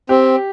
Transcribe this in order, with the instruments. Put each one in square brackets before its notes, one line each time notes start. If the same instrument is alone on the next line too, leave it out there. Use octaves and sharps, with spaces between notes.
[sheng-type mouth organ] C4 [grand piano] G4